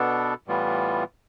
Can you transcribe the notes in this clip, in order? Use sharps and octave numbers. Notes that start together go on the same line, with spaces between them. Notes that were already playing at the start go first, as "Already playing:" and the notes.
Already playing: B2 B3 D4 A4
A2 E3 G3 B3 F4